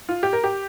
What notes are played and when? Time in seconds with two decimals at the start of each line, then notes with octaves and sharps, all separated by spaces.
0.09 F4
0.23 G4
0.33 A#4
0.44 G4